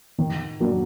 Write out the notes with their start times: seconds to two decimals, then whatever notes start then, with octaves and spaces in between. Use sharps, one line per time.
0.18 D#3
0.60 F#3 A#3 D4